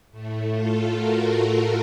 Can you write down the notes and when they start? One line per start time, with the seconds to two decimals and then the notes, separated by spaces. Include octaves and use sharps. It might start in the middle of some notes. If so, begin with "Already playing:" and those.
0.11 A2 A3
0.52 F4 A4
0.93 F#4 A#4